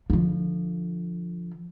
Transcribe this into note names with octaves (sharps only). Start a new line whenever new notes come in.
D3 F3